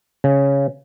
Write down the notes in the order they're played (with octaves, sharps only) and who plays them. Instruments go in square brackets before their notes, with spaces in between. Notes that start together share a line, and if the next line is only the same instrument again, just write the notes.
[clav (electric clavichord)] C#3